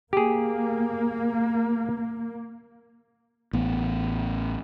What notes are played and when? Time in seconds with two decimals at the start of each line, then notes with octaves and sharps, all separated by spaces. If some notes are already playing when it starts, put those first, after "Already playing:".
0.13 A#3 G4 G#4
3.53 A1 B3